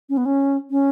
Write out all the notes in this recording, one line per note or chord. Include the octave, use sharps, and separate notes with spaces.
C#4
B3
C#4
C#4